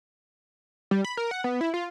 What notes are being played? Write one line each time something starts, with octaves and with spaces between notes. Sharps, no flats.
G3
B5
A#4
F#5
B3
E4
F4